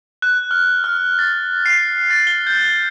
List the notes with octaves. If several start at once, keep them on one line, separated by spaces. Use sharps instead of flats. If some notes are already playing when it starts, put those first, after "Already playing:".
F#6
F6
F6
A6
C7
A6
G7
G6